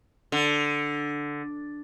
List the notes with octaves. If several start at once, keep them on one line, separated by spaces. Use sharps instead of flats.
D3